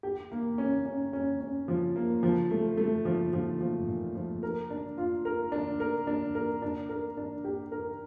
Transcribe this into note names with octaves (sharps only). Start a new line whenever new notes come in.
G4
A#3
C#4
C#4
C#4
C#4
F3
A#3
F3
A3
A3
F3
F3
F3
A#2
F3
A#4
D4
F4
A#4
D4
A#4
D4
A#4
D4
A#4
D4
G4
A#4